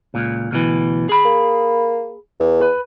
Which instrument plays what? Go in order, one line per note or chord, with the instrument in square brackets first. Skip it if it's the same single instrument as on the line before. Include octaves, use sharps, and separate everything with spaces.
[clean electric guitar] C#2 A#2
D2 B2 E3
G#4 B5
[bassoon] A#3
E2
[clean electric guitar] B4